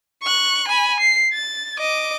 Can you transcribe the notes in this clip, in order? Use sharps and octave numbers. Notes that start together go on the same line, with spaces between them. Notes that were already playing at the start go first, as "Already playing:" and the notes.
C#6 F#6
G#5 B5
C7
A6
D#5 D6